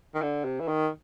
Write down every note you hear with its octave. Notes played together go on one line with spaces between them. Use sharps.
D#3
D3
C3
E3
D#3